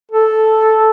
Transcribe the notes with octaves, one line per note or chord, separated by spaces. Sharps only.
A4